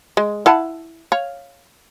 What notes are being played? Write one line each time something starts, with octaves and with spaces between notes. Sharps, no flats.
G#3
E4 F#5 A5
C#5 F5